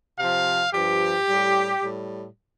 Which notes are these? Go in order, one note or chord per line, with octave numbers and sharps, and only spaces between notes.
C3 F3 F5
G2 F3 G4
A2 G3
A2 G3